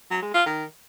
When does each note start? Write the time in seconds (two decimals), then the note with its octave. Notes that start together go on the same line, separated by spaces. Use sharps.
0.10 F#3
0.22 G#3
0.34 F4
0.46 D#3